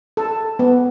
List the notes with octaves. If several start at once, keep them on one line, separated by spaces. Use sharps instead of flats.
A4
B3